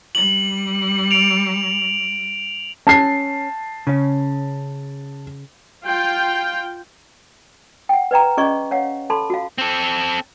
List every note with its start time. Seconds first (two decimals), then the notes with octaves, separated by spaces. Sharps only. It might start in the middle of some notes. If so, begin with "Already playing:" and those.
0.15 G3 F#7
1.11 D7 F7
2.87 C#4 A5 C7
3.87 C#3 C#4
5.84 F4 G5
7.89 F#5 G5
8.11 B4 D5 G5 A#5
8.37 C#4 G#4 D5 D#5 C#6
8.71 C#5 F5 F#5
9.10 A4 A5 B5 C6
9.30 F#4 F5
9.58 C4 A4